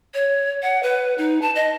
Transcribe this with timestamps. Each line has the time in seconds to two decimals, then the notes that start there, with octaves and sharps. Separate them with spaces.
0.14 C#5
0.63 F#5
0.83 B4
1.18 D#4
1.42 A5
1.55 D#5